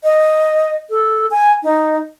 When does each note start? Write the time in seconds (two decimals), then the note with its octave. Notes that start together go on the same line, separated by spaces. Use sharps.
0.03 D#5
0.90 A4
1.31 G#5
1.63 D#4